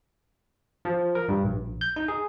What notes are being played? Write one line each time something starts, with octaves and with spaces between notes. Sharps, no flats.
F3
A#4
G2
A#1
G6
D#4
G#4